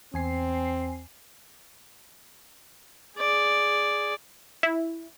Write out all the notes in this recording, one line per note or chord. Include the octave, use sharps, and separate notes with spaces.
E2 C4 G#5 C7
G#4 D5
E4